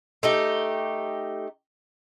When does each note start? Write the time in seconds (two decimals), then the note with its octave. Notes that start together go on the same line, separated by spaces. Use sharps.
0.23 A3 D#4 G4